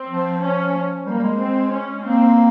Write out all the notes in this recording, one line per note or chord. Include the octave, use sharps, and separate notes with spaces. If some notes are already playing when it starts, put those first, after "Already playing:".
Already playing: C4
F3
C#4
G3 A#3
G3
G#3
C4
C#4
A#3 C4